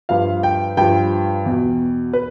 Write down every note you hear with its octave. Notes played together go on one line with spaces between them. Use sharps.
G2 F3 F5
G5
G2 F3 G5
E2 B2
B4